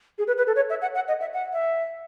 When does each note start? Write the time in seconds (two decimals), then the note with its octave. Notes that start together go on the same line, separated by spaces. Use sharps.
0.18 G#4
0.27 B4
0.38 B4
0.47 A4
0.56 C#5
0.70 E5
0.82 F#5
0.95 F#5
1.08 D#5
1.21 E5
1.33 F#5
1.53 E5